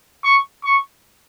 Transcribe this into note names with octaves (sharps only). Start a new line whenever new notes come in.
C#6
C#6